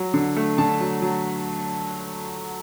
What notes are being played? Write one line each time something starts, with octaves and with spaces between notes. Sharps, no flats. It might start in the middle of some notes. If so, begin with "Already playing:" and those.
Already playing: F#3
D3
A3
D3 A5
F#3
F#3